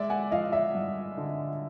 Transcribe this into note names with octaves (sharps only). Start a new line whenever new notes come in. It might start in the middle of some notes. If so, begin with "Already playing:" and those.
Already playing: G#3 D5 E5
F#5 G#5
F3 D#5 F5
D5 E5
G2
D3